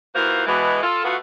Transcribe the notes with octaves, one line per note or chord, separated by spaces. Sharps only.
D#3 E3 A#3 F4 F#4 C5
B2 E3 G#3
F4 A4
B2 A3 B3 F4 F#4